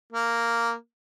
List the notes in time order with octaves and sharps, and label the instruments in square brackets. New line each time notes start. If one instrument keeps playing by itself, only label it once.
[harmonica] A#3